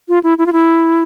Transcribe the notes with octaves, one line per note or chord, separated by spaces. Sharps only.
F4
E4
E4
F4
E4